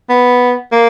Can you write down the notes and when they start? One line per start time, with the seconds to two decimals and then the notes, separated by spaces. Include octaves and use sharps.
0.10 B3
0.72 A#3